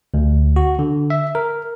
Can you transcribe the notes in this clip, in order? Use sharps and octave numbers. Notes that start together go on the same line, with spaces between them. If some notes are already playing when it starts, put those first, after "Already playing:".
D2
F#4
D3
E5
A#4